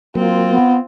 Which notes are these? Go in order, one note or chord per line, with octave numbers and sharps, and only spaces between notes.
F#3 A#3 C4 F4
B3